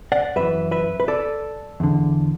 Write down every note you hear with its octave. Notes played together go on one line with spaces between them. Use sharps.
D5 F#5
F#2 E3 B4 E5
B4 E5
B4
A4 D5
E2 D3